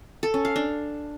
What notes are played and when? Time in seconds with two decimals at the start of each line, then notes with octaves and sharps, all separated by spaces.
0.23 A4
0.34 C#4
0.45 F5
0.56 D4